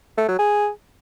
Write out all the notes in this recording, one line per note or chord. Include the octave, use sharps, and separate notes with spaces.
A3
F#3
G#4